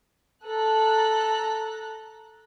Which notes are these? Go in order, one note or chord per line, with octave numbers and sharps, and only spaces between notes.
A4 A#5 F#6